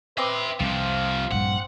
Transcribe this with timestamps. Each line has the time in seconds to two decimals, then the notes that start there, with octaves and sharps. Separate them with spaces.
0.18 C4 B4 D#5 E5 C6 D6
0.60 C2 C3 F3 F5
1.32 A#1 G2 G3 F#5